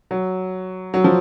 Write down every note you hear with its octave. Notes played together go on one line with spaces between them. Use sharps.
F#3
F#3
F3